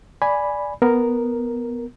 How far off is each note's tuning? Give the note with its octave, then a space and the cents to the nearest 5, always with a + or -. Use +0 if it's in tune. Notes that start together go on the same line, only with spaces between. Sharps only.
D5 -5 G#5 +0 B5 +0
B3 +0 A#4 +0